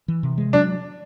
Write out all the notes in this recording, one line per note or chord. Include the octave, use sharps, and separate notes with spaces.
E3
C3
G#3
F#3 D4